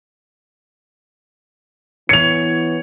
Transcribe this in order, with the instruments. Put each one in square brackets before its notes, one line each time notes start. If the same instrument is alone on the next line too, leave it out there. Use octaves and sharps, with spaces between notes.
[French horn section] E3 B3 [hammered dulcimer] C#5 [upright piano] C#7 F7